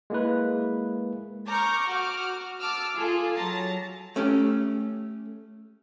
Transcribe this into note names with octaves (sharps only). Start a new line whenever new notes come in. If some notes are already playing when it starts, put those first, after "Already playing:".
G#3 A#3 E4 B4
A#5 C#6 D6 F6 G6
F#4 D6 F6
A5 D6 E6 F6
F4 G#4 A4
F#3 A5 A#5
A3 C#4 G4 A4